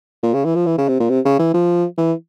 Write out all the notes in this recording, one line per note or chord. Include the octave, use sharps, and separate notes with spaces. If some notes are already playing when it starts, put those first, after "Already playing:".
A#2
C#3
E3
F3
E3
C#3
C3
A#2
C3
C#3
E3
F3
E3